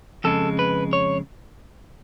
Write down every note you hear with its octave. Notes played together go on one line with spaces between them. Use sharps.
F2 C#3 G#3 A4
B4
C#5